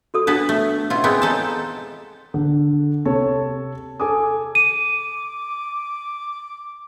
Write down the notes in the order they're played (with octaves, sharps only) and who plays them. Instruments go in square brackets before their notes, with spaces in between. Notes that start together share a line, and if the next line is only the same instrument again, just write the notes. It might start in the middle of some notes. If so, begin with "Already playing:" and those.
[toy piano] F#4 A4 D#6
[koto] B3 B4 A5 [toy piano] D4
[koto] A3
B2 E4 F4
[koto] G#3 B3 C4 [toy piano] G#4 G#5
[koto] D#4 A4 A5
[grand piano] D3
C3 A4 C#5 A5
A4 G#5 D6 D#6
[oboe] D6 [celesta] D#7